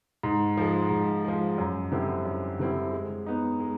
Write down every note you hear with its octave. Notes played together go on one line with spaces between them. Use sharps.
G#2
F3 G#3
G#2
F3 G#3
F#2
D3 G3 C4 E4
F#2
D3 G3 C4 E4
G#3
B3 D#4
G#3